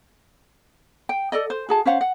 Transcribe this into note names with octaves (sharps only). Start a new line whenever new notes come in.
G5
A4 D5 D#5
C5
F#4 G#4 A5
C#4 C5 F5 F#5
F#5